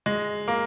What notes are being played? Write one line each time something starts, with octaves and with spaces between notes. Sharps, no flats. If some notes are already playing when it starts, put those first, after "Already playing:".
G#3
A#3